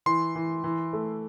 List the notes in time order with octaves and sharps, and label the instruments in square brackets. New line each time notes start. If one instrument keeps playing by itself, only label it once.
[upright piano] E3 [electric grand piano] C6
[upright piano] E3
E3
A3